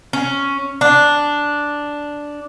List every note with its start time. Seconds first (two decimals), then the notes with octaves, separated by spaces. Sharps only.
0.13 C#4
0.81 D4